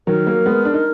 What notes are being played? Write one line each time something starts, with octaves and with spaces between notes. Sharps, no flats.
D#3 F#3 A#4
F#3 A#3
G#3 B3
D4
D#4